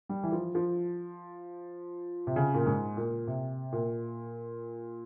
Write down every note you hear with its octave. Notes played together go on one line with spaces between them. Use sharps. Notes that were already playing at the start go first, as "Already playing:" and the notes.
G3
E3
F3
F3
C3
C#3
A#2
G#2
A#2
C3
A#2